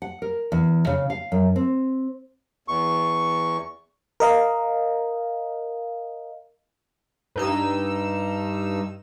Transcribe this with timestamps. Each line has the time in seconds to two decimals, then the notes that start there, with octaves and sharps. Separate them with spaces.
0.02 F#5
0.22 A#4
0.52 E2
0.87 C#3
1.10 F5
1.32 F#2
1.56 C4
2.68 E2 C#6
4.20 A#4 D#5 F5
7.36 G2 D#4 E6